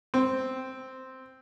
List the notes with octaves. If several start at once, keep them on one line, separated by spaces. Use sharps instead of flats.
C4